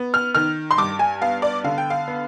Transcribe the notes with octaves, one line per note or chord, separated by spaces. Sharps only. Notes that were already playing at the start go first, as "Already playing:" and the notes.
Already playing: B3
F6
D#3 F6
C6
G2 D6
G#5
B3 F5
D5
D3 F5
G5
F5
B3